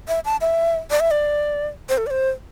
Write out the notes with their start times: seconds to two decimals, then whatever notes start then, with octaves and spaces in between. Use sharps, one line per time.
0.08 E5
0.25 A5
0.41 E5
0.91 D5
1.00 E5
1.11 D5
1.89 C5
1.98 A4
2.07 D5
2.11 C5